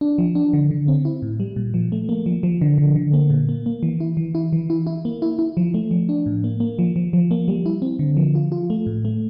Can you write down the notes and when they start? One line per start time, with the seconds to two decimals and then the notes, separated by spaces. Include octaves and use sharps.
0.01 D4
0.18 F3
0.35 D4
0.53 D3
0.71 D3
0.88 C4
1.05 E4
1.22 A2
1.40 G3
1.56 A#2
1.74 F3
1.92 A3
2.09 A#3
2.26 F3
2.43 F3
2.61 D3
2.78 D3
2.95 D3
3.13 A#3
3.30 A#2
3.49 A#3
3.66 A#3
3.83 E3
4.00 E4
4.17 E3
4.35 E4
4.53 E3
4.70 E4
4.87 E4
5.05 A#3
5.22 E4
5.39 E4
5.57 F3
5.74 A3
5.91 F3
6.09 D4
6.26 A2
6.44 A#3
6.60 A#3
6.79 F3
6.96 F3
7.13 F3
7.31 A#3
7.48 G3
7.66 E4
7.82 C4
7.99 D3
8.17 F3
8.35 F4
8.52 F4
8.70 A3
8.86 A2
9.05 A3